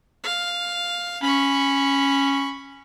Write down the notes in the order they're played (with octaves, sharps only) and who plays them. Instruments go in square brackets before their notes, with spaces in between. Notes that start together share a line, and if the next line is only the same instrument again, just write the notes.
[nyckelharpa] F5
[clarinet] C#4 [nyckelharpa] B5 C#6